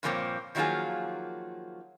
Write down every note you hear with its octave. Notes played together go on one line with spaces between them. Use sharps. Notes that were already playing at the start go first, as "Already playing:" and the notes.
G2 A#2 F3 A#3 C4 C#5
D#3 F3 F#3 A#3 F4 G#4